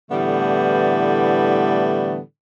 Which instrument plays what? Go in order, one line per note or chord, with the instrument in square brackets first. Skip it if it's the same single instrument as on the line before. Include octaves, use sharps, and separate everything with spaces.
[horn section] A2 D3 E3 G3 A3 B3